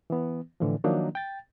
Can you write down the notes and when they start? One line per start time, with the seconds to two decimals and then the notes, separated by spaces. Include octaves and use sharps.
0.10 E3 B3
0.60 A2 D3 E3 F3
0.84 D#3 F3 F#3 A#3 D4 D#4
1.15 G5 A6